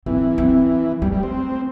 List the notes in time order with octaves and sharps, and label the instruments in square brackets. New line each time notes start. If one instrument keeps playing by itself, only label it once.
[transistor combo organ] E3 [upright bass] C4
[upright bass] C4
[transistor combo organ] G3 [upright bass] A3
[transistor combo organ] G3
C4